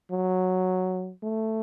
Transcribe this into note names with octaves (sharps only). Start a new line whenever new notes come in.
F#3
A3